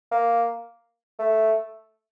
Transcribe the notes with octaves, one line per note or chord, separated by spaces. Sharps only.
A#3
A3